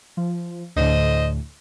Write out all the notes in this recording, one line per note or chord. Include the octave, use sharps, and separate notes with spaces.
F3
D2 A2 D3 C5 D#5